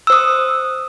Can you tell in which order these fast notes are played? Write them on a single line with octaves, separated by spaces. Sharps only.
E6 C5 D#6